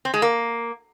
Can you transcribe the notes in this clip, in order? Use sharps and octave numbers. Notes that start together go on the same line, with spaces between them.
C4
G#3
A#3